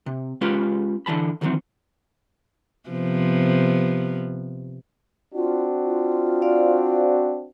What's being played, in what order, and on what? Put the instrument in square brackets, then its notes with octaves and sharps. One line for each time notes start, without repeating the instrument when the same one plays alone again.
[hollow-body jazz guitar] C3
G#3 C#4 F4 G4 B4
D3 E3 A5 B5
D2 D#3 E3 F#3 C4
[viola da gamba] C3 F3 B3
[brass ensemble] C4 D4 F#4 [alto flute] F4
[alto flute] F4
[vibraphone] C5 D5 F5